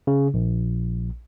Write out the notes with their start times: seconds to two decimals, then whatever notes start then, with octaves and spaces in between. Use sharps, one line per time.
0.07 C#3
0.34 A#1